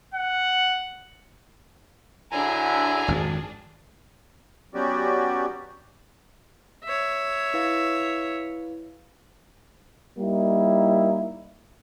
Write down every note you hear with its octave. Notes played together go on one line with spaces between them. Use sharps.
F#5
D3 F#3 D4 E4 G#4 G#5 A#5
G#1 F2
F#3 B3 C#4 F#4 G4 D5
C#5 E5
E4 B4 F5
G3 A#3 D#4 E4